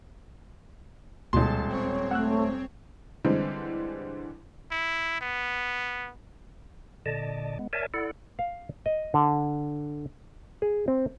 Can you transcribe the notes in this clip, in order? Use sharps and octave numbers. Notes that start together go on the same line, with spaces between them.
D#1 D2 B2 G#3 A5 C6
C4 C#5
A3 F#5 E6 F#6
D3 E3 G3 G#3 C4
E4
B3
A#2 D3 D5 D#5 A5
G#3 B3
A#4 C#5 D5 E5 G#5 A5
E4 A4 D5 F#5
F5
D#5
D3
G#4
C4